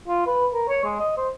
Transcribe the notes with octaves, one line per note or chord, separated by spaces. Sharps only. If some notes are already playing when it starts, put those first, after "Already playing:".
F4
B4
A#4
C#5
G#3
D#5
C5